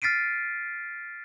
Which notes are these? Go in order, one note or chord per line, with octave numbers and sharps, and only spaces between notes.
F6 A6 B6 C7 D7 D#7